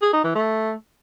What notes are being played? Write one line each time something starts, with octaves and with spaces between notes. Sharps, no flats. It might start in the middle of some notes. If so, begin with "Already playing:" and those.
G#4
D#4
E3
A3